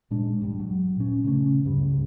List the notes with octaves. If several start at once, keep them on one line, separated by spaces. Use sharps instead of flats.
A#2 G#3 D4
G2 G3
F#3
A#2 C#4
C#3 A3 C#4
C#2 G2 C#3 G3